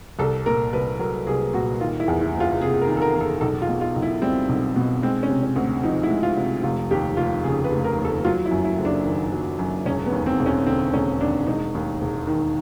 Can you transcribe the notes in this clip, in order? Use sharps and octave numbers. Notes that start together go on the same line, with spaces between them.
C2 A4
A#2 A#4
C2 B4
F#3 A#4
C2 G#4
A#2 F#4
D#3 F4
E4
E2
E4
F#1
F4
C3 G#4
A#4
D#3
A4
A#4
E2
A4
B1 A4
F4
B2
F4
B1
E4
G3 C4
B1
B2
G#3 C4
C#4
C3
C#4
D2
F3 D#4
E4
G#3
F4
C3
F1 F4
D#2 G4
F1 F4
C#3 G#4
B4
F1
A#4
D#2
A4
F#3 F4
E4
F#2
E4
F#1
D4
D#3
F#3
F#2
E1 C#4
B3
D#2
C4
E1
C#4
D3 C4
E1 C#4
D#2 D4
E1 D#4
D#2
E1
D#3